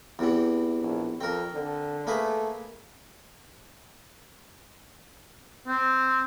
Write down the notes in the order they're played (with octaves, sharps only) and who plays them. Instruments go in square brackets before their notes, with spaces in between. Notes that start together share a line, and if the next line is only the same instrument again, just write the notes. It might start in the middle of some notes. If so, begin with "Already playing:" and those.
[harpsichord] E2 C3 E3
[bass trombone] A#1
[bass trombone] F2 [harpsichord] C4 A#4
[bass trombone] D3
[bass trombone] A3 [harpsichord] A#3 G#4 B4
[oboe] C4